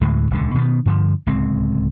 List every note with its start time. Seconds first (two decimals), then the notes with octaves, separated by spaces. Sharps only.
0.01 D2 A2 D3 G#3
0.31 D#1 C#2 D3
0.54 B2 D#3 G#3 B3
0.86 G2 D3 E3 F3
1.27 D1 C#2 G#3 C4